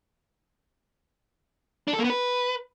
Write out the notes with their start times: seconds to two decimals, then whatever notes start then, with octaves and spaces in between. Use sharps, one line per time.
1.88 D4
1.93 A4
1.99 A#3
2.04 B3
2.10 B4